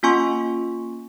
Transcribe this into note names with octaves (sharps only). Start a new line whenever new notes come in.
A#3 C#4 F4 G#5 C6 C#6